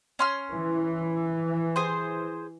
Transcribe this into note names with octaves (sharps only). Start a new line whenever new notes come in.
C#4 C6 F6
E3
G#4 C5